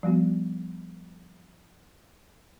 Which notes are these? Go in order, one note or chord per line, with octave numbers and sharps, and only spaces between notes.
F3 G3 B3 F#4